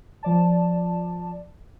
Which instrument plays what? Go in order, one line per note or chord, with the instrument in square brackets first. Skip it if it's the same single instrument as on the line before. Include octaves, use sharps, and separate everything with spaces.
[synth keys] F3 D5 A5